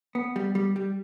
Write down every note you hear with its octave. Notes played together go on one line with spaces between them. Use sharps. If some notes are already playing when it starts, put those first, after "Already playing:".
B3
G3
G3
G3